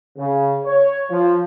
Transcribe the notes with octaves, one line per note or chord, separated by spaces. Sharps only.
C#3
C#5
F3